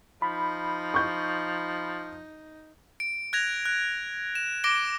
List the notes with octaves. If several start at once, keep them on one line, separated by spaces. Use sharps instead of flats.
F3 D#4 B5
C#6 G6
D7
F#6 G#6 A#6 F7
F#6
E7
D6 A#6 D7 G7